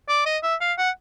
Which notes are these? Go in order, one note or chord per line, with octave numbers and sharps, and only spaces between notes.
D5
D#5
E5
F5
F#5